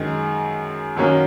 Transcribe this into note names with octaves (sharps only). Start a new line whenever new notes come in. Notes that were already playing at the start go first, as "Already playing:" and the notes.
Already playing: F#2 D#3 G#3
F#2 D#3 F#3 A#3 C#4